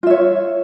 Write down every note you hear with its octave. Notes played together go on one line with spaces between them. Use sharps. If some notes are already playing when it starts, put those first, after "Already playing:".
F4 C#5 E5